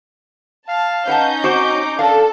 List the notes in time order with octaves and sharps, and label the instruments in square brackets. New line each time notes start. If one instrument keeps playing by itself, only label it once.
[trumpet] F5 [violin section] A5
[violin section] C#4 D#4 G6 [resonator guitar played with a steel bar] B4 F#5 A5
[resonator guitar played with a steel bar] C4 F#4 C5 [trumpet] D6
[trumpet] D4 [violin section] A4 [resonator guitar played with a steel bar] A#4 F5